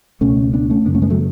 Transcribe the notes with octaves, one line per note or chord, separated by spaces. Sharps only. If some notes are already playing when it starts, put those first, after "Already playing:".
C#2 B2 A3 C#4
B3 D4
A3 C#4
F#2 C#3 B3 D4
A3 C#4
G#3 B3
F#3 A3